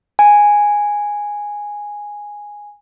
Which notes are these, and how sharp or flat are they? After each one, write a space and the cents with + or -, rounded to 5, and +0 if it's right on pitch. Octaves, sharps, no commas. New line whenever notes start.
G#5 -5